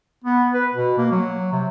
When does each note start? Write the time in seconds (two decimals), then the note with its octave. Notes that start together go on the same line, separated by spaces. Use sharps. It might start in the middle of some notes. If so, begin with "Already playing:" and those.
0.25 B3
0.54 B4
0.74 B2
0.98 A#3
1.12 F#3
1.52 C3